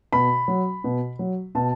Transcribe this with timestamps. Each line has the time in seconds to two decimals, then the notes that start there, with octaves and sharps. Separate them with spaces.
0.13 B2 B5
0.48 F#3
0.84 B2
1.19 F#3
1.55 B2 A5